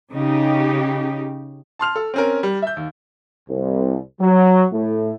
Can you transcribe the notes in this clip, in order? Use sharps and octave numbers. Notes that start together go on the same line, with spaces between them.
C#3 D#4 G4
A5 C6 F6 F7
A4
C4 C#4 A#4
G3
E5 G6
D#2
C2
F#3
A2